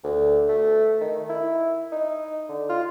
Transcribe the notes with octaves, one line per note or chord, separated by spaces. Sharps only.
D2
A3
D#3
E4
D#4
D3
F4